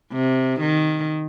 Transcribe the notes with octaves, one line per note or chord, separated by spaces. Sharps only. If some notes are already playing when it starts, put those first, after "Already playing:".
C3
D#3